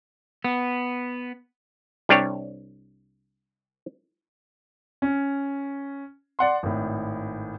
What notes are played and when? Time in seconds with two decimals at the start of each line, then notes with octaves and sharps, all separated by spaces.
0.44 B3
2.09 C2 G3 D4 G4 C#5
5.02 C#4
6.39 D5 F#5 C6
6.63 G#1 A2